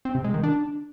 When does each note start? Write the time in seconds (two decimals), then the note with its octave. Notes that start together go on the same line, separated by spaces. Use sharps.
0.05 C4
0.15 C3
0.24 G#3
0.34 D#3
0.43 D4